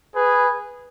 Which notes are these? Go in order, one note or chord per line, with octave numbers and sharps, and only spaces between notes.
G#4 B4